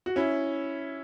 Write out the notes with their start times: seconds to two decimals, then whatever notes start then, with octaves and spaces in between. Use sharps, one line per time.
0.06 F#4
0.16 C#4 E4